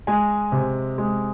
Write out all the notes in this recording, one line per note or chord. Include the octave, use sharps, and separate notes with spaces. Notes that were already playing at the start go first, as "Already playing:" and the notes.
G#3 G#5
C3
G#3